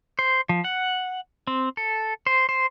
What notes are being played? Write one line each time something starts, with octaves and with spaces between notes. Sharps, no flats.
C5
F3
F#5
C4
A4
C5
C5